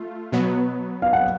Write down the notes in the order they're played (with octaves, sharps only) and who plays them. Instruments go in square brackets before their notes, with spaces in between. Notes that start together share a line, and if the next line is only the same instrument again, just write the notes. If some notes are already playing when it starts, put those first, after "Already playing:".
Already playing: [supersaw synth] A3 F4
B2 F#3 B3
[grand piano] F5
F#5